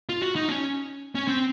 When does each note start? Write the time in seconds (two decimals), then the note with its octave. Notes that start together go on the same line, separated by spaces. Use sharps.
0.09 F4
0.22 F#4
0.36 D#4
0.49 C#4
1.15 C#4
1.28 C4